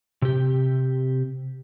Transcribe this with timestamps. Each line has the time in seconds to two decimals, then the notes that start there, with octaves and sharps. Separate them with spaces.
0.22 C3 G4